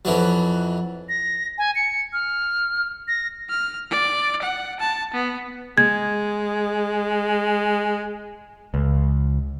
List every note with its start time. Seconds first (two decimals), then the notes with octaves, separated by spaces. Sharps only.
0.05 F2 E3 F#3
1.09 A#6
1.58 G#5
1.75 C#7
2.13 F6
3.08 A#6
3.50 F6
3.90 D5
4.42 F#5
4.80 A5
5.14 B3
5.78 G#3 G#6
8.74 C#2